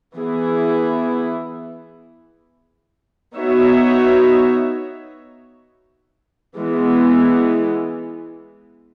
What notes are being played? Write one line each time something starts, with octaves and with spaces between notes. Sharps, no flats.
E3 B3 E4 G#4
B3 D#4 F#4 C#5 E5
E3 G#3 B3